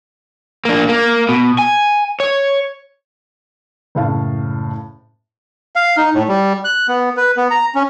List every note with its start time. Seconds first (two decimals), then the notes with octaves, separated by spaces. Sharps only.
0.65 A#3 D4
0.89 A#3
1.29 B2
1.59 G#5
2.20 C#5
3.95 F#1 A2 F5 A5
5.76 F5
5.97 D#4
6.14 A2
6.29 G3
6.65 F#6
6.88 B3
7.17 B4
7.37 B3
7.51 A#5
7.75 C#4